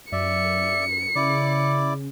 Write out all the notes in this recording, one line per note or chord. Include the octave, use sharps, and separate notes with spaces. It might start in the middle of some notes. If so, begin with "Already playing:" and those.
F#2 D5 E5 C#7
C#3 E4 D5 D6